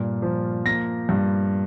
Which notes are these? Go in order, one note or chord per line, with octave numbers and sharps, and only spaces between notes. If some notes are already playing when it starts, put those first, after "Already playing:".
Already playing: G2 A#2 A#3
F3
A#3 A#6
G2